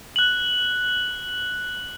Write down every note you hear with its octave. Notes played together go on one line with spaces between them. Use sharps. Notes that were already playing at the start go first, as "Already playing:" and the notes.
F#6 F#7